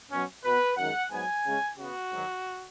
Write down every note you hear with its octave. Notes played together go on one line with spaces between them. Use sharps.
B2 F#3 C#4
B2 B3 B4
F#2 D#3 G#3 F#5
G#2 F#3 B3 G#5
C#3 G#3 C#4
C#3 B3 F#4
G#2 D#3 F#3